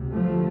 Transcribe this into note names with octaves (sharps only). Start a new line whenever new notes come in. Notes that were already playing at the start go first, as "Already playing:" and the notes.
Already playing: D2 C3
F3 A3